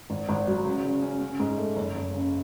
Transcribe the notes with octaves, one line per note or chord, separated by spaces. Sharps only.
G#1
G#1
F#3
C#3
C#3
C#4
C#4
G#2
A3
F#1
F#1
C#3